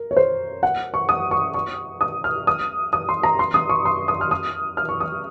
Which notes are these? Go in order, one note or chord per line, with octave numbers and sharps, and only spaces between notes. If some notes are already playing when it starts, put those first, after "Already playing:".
Already playing: A#4
C#5
C5
F#5
C#6
D#6
C#6
C#6
D#6
F6
D#6
D#6
C6
A#5
C6
D#6
C#6
C6
D#6
F6
D#6
F6
C#6
D#6